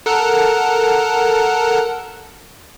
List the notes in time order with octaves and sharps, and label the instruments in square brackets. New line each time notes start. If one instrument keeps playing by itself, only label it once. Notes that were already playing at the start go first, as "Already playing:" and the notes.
[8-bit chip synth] A4 A#4 F#5